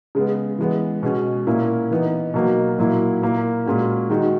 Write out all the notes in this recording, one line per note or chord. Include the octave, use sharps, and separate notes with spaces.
C#3 G#3 B3
E3 G#3 B3
B2 G#3 C#4
A#2 A#3 C#4 E4
E3 B3 D#4
B2 F#3 A#3 D#4
A#2 F#3 A#3 E4
A#2 A#3 E4
A#2 G#3 C#4 F#4
D#3 G#3 D#4 F#4